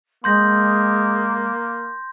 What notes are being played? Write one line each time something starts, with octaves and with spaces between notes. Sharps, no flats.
G#3 A#3 C6 G6 A#6